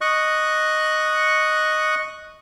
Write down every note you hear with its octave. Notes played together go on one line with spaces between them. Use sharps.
D#5 C#6 F#6